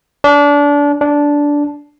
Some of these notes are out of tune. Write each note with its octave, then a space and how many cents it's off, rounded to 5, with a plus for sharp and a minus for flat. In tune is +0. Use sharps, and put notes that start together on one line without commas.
D4 -25
D4 -10